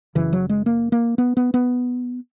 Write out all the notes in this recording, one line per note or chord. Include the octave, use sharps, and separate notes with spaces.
F#1 F#2 C#3 E3
F#3
G#3
A#3
A#3
B3
B3
B3